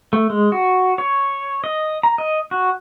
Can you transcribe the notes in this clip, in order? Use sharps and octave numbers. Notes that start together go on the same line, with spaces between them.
A3
G#3
F#4
C#5
D#5
A#5
D#5
F#4